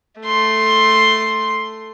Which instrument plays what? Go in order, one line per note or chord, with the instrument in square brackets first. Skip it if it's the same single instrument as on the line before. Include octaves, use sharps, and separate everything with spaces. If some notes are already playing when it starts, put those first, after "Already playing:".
[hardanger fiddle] A3 C6